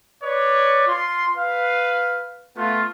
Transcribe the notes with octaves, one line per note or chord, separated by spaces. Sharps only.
B4 C#5 D5
F4 C6
B4 F5
A3 B3 F4